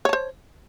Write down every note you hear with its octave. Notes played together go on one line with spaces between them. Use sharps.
C5 C#5 A5